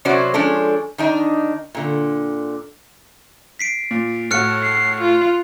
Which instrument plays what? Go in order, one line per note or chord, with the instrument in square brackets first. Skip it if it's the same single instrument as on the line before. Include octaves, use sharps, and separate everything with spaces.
[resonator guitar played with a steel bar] C3 F#3 C#4 F#4 C5 D5
F3 G#3 C#4 D4 A4
D#3 D4 D#4
A#2 D3
[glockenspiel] B6 C7 D7
[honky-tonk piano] A#2
[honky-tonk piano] A2 F#4 [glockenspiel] F6 F#6 C#7
[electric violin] C7
F4